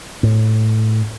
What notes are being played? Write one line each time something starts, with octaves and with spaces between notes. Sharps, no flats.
A2